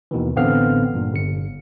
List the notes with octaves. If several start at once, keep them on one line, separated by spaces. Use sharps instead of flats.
D#2 B2 D#3 E3
A1 D3 B3 C4 F5 F6
G2 A#2
G1 C#7